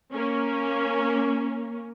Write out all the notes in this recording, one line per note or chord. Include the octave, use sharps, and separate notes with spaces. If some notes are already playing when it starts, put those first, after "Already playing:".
A#3 C#4